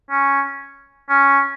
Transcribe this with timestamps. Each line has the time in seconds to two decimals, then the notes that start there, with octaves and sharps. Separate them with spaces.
0.10 C#4
1.09 C#4